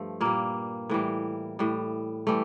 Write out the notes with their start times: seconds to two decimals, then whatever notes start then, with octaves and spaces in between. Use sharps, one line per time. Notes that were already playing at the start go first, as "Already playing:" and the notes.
Already playing: G2 F3 A3
0.21 A#2 G3 A#3
0.90 A2 E3 G3
1.59 A2 G3
2.27 E3 G3 A3